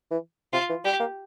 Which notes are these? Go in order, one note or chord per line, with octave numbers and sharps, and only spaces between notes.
E3
C3 F4
E3
G3 G4
A#3